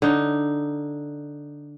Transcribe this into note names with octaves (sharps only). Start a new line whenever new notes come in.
D3 D#4